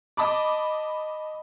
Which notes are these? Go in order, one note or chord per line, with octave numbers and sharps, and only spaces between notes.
D#5 A5 B5 D6